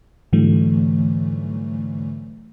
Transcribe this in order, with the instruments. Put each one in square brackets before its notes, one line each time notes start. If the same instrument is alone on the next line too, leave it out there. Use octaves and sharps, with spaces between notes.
[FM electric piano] G#2 D3 E3 F#3 G3 A3